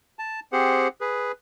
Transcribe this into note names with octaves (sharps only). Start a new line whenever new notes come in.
A5
C4 G4 G#4 C5 F#5
G#4 B4